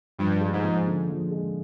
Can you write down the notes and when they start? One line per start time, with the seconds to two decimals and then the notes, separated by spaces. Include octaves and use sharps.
0.18 G2 F3
0.41 G#3
0.53 G#2
0.64 F3
0.86 D3
1.09 F3
1.31 G#3